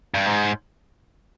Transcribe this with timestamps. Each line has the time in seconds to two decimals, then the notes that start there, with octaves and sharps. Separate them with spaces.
0.14 G2
0.26 G#2